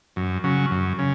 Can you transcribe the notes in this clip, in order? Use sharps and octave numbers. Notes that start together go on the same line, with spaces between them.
F#2
C#3 F#3
F#2
C#3